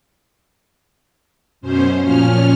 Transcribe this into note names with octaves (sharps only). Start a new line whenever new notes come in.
F#2 B2 C#4 C5
A#2 F3 C#4 F6